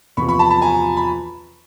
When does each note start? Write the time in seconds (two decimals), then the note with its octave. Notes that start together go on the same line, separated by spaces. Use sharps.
0.17 E2 C3 F3 B5 C#6
0.28 B5 C#6
0.39 A5 B5
0.50 A5 B5
0.61 G#5 A#5
0.97 B5